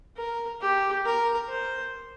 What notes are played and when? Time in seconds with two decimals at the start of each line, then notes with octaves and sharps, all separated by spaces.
0.17 A#4
0.61 G4
1.05 A#4
1.49 C5